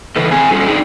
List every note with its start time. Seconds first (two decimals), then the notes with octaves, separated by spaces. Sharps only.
0.16 C#3 E3 A4 B4 D#5
0.31 C4 G#4 G#5
0.51 G3 C#4 F4 A4
0.66 C4 D4 D#4 G#4 G5